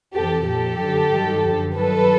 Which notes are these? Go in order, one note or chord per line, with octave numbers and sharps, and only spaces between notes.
F2 C3 E3 G4 A4
A#2 F3 G4 A4
F#2 D3 F#3
G2 D#3 F#3
F#2 D3 F3
G2 D#3 F#3 A4 B4